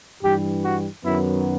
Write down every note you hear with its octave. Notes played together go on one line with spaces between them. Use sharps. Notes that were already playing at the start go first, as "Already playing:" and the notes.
G2 E3 G3 G4
F#4
F#2 D#3 F#3 B3 E4